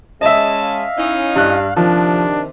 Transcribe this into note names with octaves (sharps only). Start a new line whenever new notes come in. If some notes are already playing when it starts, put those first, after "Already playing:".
G#3 C#4 D#5 E5 A5
F5
C#4 D#4 E4
G2 F#6
C3 D#3 F3 D4